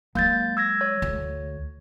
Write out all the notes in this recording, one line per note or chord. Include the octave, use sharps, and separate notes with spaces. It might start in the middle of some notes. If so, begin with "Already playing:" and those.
F#3 G#3 A#3 G6 A6
E6 G#6 A#6
C#5
D2